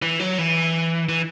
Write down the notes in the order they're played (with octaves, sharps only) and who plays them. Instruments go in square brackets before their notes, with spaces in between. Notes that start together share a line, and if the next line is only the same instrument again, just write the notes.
[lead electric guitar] E3
F#3
E3
E3